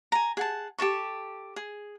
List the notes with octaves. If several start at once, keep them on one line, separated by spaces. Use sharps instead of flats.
G#5 A#5
G#4 F#5 A5
G4 A4 A5 C#6
G#4